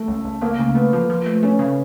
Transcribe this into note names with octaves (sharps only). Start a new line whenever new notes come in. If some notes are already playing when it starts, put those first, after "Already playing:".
Already playing: A3
C#2
C#2
A3 A#3
C#3
A3 B3
F3
F3
A3
A3 C#4
C#3